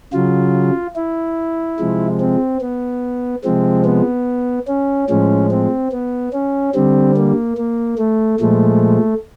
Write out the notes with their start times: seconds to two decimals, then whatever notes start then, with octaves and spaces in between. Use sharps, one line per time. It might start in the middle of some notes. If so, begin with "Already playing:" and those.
0.13 C#3 F#3 F4
0.96 E4
1.79 C3 F3 G#3
2.20 C4
2.61 B3
3.44 C3 F3 G#3 C4
3.85 B3
4.68 C#4
5.09 A2 F3 G#3 C#4
5.51 C4
5.92 B3
6.33 C#4
6.74 D3 G3 C4
7.17 A#3
7.57 A#3
7.98 A3
8.40 A#2 F3 G#3 A3